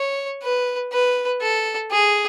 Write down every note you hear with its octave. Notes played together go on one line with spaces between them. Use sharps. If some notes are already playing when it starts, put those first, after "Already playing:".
Already playing: C#5
B4
B4
A4
G#4